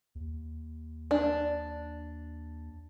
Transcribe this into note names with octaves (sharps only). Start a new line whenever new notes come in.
D#2
D4